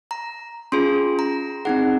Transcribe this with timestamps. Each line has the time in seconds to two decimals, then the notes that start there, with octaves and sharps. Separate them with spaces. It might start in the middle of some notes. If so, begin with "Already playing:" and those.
0.11 A#5
0.72 C#4 F4 G#4 C6
1.19 A#5
1.65 C4 D#4 G#4 F#5